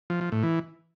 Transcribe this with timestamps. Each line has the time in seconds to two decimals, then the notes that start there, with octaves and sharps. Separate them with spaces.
0.10 F3
0.21 F3
0.32 A2
0.43 E3